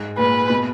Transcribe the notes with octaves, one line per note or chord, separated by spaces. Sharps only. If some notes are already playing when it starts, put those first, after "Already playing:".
Already playing: G#2
A#2 B4
B2